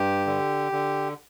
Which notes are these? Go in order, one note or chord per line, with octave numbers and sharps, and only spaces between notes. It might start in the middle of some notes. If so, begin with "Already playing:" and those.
Already playing: G2 G4
D3
D3